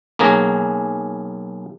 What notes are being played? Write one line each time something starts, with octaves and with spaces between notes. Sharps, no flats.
B1 A#3 C#4 G#4 A#5